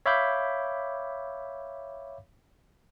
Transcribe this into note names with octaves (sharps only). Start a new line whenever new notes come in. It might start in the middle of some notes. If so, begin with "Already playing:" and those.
C#5 E5 F5 B5 D6 G6